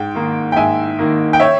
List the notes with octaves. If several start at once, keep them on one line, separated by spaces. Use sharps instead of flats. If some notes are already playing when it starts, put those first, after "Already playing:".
Already playing: G#2 G5
D#3 A#3
G5
G#2 E5 G#5
D#3 A#3
G5
C#5 E5